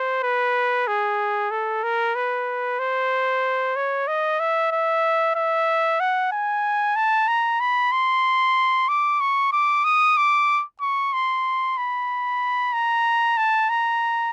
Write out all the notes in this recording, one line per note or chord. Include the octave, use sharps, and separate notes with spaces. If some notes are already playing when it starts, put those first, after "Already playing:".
Already playing: C5
B4
G#4
A4
A#4
B4
C5
C#5
D#5
E5
E5
E5
F#5
G#5
A5
A#5
B5
C6
D6
C#6
D6
D#6
D6
C#6
C6
B5
A#5
A5
A#5